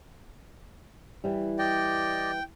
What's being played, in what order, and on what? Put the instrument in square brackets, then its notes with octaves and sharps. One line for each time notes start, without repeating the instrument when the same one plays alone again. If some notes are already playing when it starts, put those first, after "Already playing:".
[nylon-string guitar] E3 G3
[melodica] G4 D5 D#5 [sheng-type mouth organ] G5